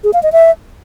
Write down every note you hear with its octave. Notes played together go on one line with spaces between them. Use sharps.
G#4
F5
D#5
E5